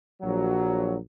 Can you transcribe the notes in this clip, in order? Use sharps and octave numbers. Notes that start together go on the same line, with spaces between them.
A#1 F#3